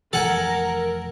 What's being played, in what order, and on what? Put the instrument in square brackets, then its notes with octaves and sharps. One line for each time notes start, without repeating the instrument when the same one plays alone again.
[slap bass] F1 E3 [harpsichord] A4 F#5 G#5 [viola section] A#4